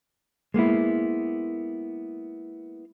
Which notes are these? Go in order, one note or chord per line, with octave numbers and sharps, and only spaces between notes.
G#3 A#3 B3 E4